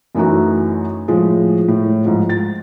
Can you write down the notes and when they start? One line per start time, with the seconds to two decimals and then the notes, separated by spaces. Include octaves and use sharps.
0.15 F#2 E3 A3 D#4 F#4
1.08 A2 F3 G#3
1.68 A2
2.04 G#2 F3
2.29 A6